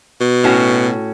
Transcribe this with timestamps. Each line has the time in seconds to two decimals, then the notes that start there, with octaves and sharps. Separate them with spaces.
0.21 B2
0.44 A2 C#4 F#4